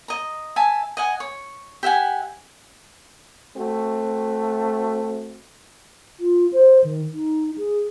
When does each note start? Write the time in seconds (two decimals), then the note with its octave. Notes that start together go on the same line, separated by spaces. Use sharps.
0.08 D#5 A#5
0.56 E5 G#5 A5
0.97 D#5 F#5 G#5
1.20 C#5
1.83 G4 E5 F#5 G#5
3.57 A3 C4 F#4
6.20 F4
6.53 C5
6.84 D#3
7.13 D#4
7.58 G#4